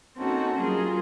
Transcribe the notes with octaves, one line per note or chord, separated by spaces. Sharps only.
A#3 C4 C#4 D#4 F#4 A4
F#3 G3 C#4 F4 G#4 A#4